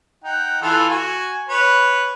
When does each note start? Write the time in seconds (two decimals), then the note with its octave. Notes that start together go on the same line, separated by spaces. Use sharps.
0.24 D#4 F#5 G5
0.62 E3 F4 A4
0.89 F#4 G#5
1.49 B4 C#5